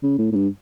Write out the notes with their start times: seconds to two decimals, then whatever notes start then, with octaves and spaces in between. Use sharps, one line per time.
0.03 C#3
0.19 A2
0.32 A2
0.36 G2